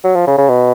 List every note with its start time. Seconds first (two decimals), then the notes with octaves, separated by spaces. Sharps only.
0.04 F#3
0.15 F3
0.27 C#3
0.38 C#3
0.49 B2